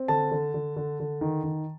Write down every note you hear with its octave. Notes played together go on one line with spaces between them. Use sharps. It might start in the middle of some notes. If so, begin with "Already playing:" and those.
Already playing: C4
D3 A5
D3
D3
D3
D3
D#3
D#3